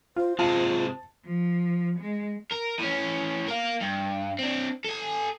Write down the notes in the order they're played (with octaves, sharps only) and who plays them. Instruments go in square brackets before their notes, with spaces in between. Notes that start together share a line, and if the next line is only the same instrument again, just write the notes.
[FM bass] F4 [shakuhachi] C5
[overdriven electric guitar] C3 G#3 [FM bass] F4 [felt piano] A5
[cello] F3
G#3
[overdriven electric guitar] A#4
A2 C#4
A#4 F5
G2
C4 D4
A4 G#5